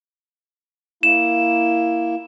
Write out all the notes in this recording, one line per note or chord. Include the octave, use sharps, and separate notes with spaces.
A#3 E4 E7